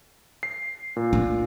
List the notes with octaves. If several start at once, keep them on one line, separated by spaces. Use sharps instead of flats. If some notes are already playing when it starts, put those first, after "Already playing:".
C7
A#2
D4